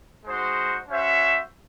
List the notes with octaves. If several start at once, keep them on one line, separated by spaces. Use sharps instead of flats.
G#3 D#4 F#4 C5
C#4 F#4 C5 E5